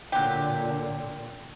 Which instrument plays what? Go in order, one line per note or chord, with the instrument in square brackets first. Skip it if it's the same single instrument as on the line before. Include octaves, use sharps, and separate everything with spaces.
[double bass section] A#2 D3 [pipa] F#3 G4